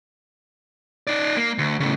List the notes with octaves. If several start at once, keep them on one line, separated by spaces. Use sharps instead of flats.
D#4 D5
A#3
D2
A2 C#3